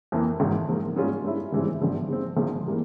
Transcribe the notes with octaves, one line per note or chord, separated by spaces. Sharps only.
F2 E3 A#3
G#1 G#2 E3
G#2 F3 A#3
G#2 G3 C#4 F4
G2 G3 C#4 E4
G#1 G2 E3 G#3 C4
G#1 G2 F3 G#3
G#2 F3 C4
G#1 G#2 F3
E3 G3 A#3